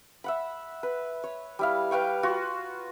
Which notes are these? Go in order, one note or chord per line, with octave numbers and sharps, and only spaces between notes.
E5 F#5 B5
B4
C#5
G3 E4 F5
B4 F5 G5 C#6
F4 F#4 C#6